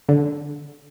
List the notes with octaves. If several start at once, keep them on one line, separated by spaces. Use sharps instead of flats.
D3